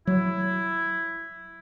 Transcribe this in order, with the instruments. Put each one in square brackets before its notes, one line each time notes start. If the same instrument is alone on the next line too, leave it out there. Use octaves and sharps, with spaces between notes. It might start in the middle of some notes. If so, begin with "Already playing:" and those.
[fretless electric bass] F#3 [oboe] E4